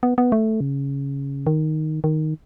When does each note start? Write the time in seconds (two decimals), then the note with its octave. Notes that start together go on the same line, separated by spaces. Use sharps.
0.03 B3
0.18 B3
0.32 A3
0.60 C#3
1.47 D#3
2.04 D#3